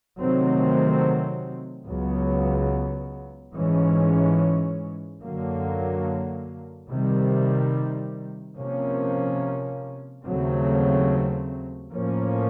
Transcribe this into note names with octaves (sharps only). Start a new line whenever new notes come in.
C3 D#3 F#3 A3 C4
C#2 C#3 F#3 B3
G#2 E3 G#3 C#4
F#2 D3 F#3 A#3
C3 D#3 G3
C3 F3 A#3 C#4
D#2 C#3 F#3 A3 C4
A2 F3 A#3 C#4